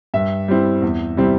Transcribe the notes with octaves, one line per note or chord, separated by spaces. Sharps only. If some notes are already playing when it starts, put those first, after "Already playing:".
G2 E5
G3 C4 E4
E2
C3 G3 C4 E4